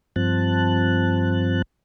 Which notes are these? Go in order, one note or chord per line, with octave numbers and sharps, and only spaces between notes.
G2 F3 C4 A5 F#6